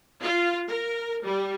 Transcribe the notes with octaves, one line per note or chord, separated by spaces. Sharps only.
F4
A#4
G3